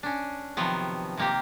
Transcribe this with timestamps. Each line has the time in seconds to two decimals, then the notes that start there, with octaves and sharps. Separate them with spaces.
0.03 C#4 D4
0.57 C3 D#3 F3 F#3 B3
1.17 C3 A#3 G4